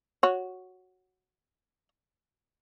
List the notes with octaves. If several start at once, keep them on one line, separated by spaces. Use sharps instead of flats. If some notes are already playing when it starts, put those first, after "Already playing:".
F#4 C#5